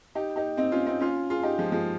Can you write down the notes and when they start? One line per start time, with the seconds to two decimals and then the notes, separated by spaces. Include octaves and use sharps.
0.15 D#4 G4
0.36 D#4 G4
0.57 C4 D#4
0.72 C#4 F4
0.86 C4 D#4
1.00 C#4 F4
1.30 F4 G#4
1.43 D#4 G4
1.58 F3 G#3
1.72 F3 G#3